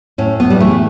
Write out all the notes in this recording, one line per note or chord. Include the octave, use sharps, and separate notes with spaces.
A2 C#4
B3
G3
E3 A3